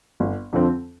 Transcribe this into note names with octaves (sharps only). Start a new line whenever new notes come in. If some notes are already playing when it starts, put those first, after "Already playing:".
G1
F2 D3 F3 C4